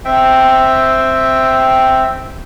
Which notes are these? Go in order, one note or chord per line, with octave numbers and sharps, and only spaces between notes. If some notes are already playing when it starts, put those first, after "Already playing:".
C4 E5 G5